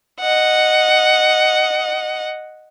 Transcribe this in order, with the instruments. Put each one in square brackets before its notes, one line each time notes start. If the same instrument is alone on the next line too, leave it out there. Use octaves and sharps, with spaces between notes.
[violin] D#5 F#5